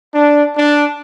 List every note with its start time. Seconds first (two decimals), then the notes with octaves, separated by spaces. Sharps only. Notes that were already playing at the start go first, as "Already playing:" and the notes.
0.14 D4
0.56 D4